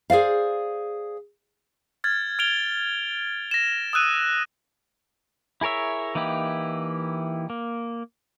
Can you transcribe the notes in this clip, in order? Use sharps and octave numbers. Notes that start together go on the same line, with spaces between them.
G#4 C5 D5 F5
F6 G#6 A6
F6 D7 F7 G7
A#6 E7
D#6 E6 F#6 D#7
E4 G#4 A#4 C#5 E5
E3 A#3 D#4 E4 G4
A#3